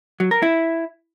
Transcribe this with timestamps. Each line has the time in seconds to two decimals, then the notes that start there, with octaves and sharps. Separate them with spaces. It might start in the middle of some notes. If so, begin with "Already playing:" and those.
0.20 F#3
0.31 A#4
0.42 E4